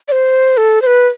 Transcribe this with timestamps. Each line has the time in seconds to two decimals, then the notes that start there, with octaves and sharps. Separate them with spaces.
0.08 D5
0.12 C5
0.57 A4
0.82 C5
0.87 B4